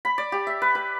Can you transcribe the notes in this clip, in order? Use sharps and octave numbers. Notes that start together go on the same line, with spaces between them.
B5
D5
G4
E5
B4
B4